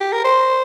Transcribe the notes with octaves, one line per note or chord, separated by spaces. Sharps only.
G4
A#4
C5